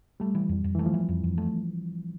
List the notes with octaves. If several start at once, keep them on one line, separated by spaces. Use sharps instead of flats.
G3 A3
E3
F2
F2
E3 A3
F3
E3
F2
F2
A3